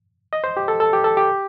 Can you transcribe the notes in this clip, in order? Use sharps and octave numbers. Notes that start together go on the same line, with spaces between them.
D#5
C5
G4
A4
A4
G4
A4
G4